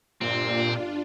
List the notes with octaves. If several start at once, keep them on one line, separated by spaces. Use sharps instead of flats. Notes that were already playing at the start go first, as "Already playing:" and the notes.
G1 A#2 C4 D4 F4